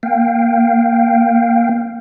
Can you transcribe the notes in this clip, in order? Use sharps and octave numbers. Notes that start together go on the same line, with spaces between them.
A#3 F5 G5